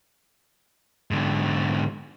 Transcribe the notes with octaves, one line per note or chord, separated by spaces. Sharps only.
G#2 D3